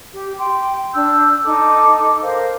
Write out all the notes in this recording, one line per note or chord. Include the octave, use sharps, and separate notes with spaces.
G4
G5 C6
D4 E6 G6
D#4 A4 D6
A#4 C5 F5